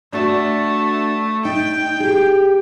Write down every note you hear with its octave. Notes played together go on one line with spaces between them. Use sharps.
A3 D4 F#4
D#4 G5
G4 G#4